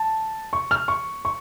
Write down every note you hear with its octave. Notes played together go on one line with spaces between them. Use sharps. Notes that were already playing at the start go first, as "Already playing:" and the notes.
Already playing: A5
C#6
F6
C#6
C#6